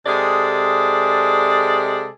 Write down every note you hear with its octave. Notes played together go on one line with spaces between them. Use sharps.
C3 G#3 G#4 A4 D5